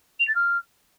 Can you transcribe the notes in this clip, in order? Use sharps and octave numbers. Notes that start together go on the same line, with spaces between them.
F7
A6
F6